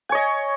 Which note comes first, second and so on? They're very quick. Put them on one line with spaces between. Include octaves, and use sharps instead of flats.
G#5 C#5 D#5